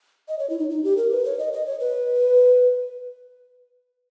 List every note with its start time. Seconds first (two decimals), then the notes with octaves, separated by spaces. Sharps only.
0.28 D#5
0.39 C#5
0.50 E4
0.59 D#4
0.70 D#4
0.84 G4
0.97 A#4
1.11 B4
1.25 C#5
1.39 D#5
1.53 D#5
1.66 C#5
1.80 B4